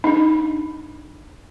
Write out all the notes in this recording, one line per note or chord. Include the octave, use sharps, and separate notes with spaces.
D4 D#4